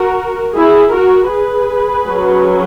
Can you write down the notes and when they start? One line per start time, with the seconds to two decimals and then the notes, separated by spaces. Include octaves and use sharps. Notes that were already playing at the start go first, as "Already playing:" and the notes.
Already playing: F#4 A#4
0.55 E4 G#4
0.93 F#4 A#4
1.32 G#4 B4
2.08 F#3 C#4